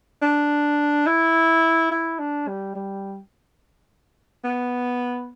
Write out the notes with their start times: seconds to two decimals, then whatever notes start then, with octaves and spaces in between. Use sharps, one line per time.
0.22 D4
1.07 E4
1.91 E4
2.19 D4
2.47 G3
2.75 G3
4.44 B3